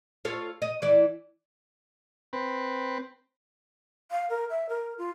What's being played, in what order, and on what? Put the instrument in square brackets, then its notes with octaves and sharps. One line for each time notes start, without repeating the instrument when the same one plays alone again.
[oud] F4 A4 C#5
D#5
E3 E4 D5
[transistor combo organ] C4 B4
[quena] F5
A#4
E5
A#4
F4